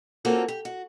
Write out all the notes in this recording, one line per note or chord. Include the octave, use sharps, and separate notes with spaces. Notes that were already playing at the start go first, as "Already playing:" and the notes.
A#3 C4 C#4 F4 F#4 A4
G4
F#4